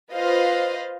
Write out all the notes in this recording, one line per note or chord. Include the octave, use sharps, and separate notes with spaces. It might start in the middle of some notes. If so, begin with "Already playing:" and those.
F4 B4 C5 D#5 F5